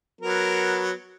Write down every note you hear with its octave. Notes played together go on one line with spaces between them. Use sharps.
F#3 B3 A#4